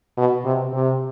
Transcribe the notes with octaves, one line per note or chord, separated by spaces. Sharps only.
B2
C3
C3